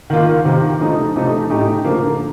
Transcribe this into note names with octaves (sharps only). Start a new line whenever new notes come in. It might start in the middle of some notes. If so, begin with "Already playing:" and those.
D#3 A#3 F4
C3 D#3 A#3
F3 A3 D#4
C3 F3 A3 D#4 A4
A2 A3 D#4 G4
D3 F3 A#3